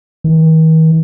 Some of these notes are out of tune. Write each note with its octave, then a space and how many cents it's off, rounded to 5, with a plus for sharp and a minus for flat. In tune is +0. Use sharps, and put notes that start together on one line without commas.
D#3 +45